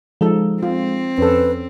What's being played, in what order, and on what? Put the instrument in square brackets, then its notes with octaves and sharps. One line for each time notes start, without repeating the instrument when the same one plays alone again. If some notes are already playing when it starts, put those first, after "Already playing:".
[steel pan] F3 D#4 A4 [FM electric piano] G#3
[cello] C4 [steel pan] F4
[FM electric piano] F2 [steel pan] C#4 A4 [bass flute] B4